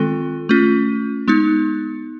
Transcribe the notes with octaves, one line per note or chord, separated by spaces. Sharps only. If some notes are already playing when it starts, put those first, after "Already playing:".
Already playing: D#3 G#3 C4 F4 A4
A3 C#4 F4
G#3 B3 D#4